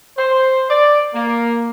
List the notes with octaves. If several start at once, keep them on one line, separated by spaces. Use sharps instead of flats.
C5
D5
A#3